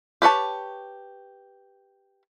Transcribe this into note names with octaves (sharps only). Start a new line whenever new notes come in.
G4 B4 C#5 A5